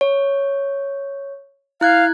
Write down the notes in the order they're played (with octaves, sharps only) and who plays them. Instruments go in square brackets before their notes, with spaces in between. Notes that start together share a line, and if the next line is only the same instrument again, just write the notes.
[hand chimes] C#5
[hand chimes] E4 F#6 G#6 [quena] F5